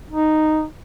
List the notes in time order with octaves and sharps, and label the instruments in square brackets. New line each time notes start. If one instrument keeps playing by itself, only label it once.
[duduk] D#4